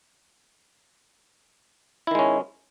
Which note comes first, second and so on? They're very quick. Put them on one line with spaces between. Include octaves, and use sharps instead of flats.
E4 D#3 G#3 C#4